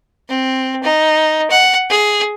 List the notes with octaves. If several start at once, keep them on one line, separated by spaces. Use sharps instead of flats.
C4
D#4
F#5
G#4